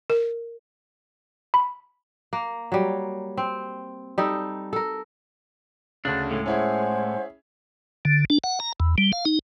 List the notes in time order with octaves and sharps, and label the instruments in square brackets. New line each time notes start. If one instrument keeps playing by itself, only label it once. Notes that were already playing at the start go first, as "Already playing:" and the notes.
[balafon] A#4
[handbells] B5
[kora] A#3
F#3 G3
C4
G3 D#4 A4
A4 A#4
[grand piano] D2 C#3 [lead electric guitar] D4
[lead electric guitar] A2 G#3 [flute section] A4
[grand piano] C#4 E4 G#4 [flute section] C5 F#5 G#5
[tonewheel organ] D3
D4
F#5
A#5
E2
G3
F5
D#4